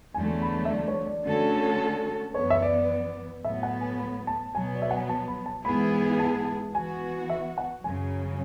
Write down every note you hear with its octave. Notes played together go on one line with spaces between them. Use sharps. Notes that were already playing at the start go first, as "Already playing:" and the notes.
E2 D3 F#3 A3 G#5
B5
E5
D5
C#5
D5
D3 A3 C#4 F#4 A4
F#2 E3 B3 C#5
E5
D5
A2 F#3 B3 E5
F#5
G#5
B5
A5
B2 F#3 B3 G#5
D5
E5
F#5
G#5
A5
B5
A5
G#2 E3 B3 E4 G#4 B5
A5
E3 B3 F#4 G#5
E5
F#5
F#2 C#3 F#3 G#5